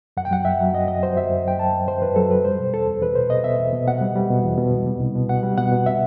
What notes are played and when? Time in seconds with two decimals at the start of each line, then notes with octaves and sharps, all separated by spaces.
0.17 F#2 F#5
0.25 G5
0.31 F#3 F#5
0.45 F#2 E5
0.60 F#3
0.74 F#2 D#5
0.88 F#2 D#5
1.03 F#3 C5
1.17 F#2 E5
1.31 F#2
1.45 F#2 G5
1.59 F#2 A5
1.73 F#2
1.88 F#2 C5
2.02 F#2 B4
2.16 F#3 A4
2.31 F#2 B4
2.44 G3 C5
2.59 B2
2.74 E2 A4
2.87 E2
3.02 E2 B4
3.15 B2 C5
3.30 B2 D#5
3.44 B2 E5
3.59 E2
3.73 B2
3.87 B2 F#5
4.01 G3
4.16 G3
4.30 B2
4.43 E2
4.58 B2
4.72 C2
4.86 G3
5.00 C2
5.15 B2
5.29 B2 F#5
5.43 G3
5.58 B2 F#5
5.72 B2
5.86 E5